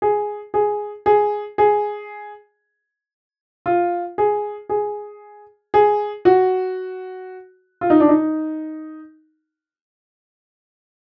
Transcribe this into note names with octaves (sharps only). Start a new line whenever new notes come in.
G#4
G#4
G#4
G#4
F4
G#4
G#4
G#4
F#4
F4
D#4
D4
D#4